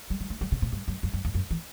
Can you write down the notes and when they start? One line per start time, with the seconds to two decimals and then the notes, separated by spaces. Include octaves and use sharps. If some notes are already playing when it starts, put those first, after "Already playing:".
0.10 G3
0.21 G3
0.30 A3
0.41 F#3
0.52 C3
0.62 B2
0.72 G2
0.88 F#2
1.03 F#2
1.13 F#2
1.25 E2
1.35 F#2
1.51 E3